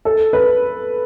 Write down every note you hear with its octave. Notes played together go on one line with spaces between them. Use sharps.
A4
B4